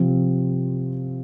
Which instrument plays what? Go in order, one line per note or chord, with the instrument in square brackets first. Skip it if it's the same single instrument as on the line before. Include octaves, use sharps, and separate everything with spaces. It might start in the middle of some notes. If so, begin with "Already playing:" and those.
Already playing: [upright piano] C3 F3 C4